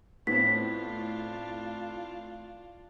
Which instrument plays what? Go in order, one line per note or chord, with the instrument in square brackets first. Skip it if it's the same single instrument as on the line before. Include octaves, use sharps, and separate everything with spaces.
[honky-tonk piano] A2 [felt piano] B3 C4 [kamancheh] D4 F4 [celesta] B6